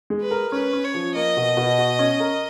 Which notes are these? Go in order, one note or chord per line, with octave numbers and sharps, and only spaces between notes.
G#3
B4
A#4
C#4 B4
C#4
C#5
F3
A#3 D#5
B2
B2
F#4
C#4
A#4